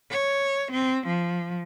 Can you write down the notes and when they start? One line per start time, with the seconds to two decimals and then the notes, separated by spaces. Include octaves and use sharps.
0.11 C#5
0.72 C4
1.07 F3